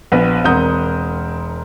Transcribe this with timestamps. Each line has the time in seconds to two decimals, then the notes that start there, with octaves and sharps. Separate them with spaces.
0.12 A#1 B3 B4
0.44 E1 C4 A#4 F#5 D#6 G6